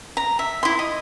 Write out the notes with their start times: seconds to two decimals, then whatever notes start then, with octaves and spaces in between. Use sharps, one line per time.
0.17 A#5
0.39 E5
0.63 E4 C6
0.79 D#5